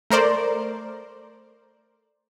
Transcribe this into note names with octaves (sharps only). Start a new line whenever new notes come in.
A3 A#4 C5 D5